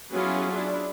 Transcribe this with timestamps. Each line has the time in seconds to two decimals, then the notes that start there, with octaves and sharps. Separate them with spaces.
0.12 F#3 B3 C#4 E4 F4 G#4
0.52 D4 E4 G#4